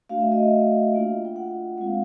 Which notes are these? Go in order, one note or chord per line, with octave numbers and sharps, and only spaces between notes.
A3 D4 F#4 F5
E5
D#5
E5
A#3 D4 F4
G5
F#5
G#3 C4 F4 F#5
F5